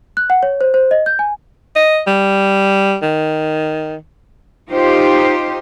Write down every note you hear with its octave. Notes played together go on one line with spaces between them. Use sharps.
F#6
F#5
C#5
C5
C5
D#5
G6
G#5
D#5
G3
D#3
D#4 F4 G4 C5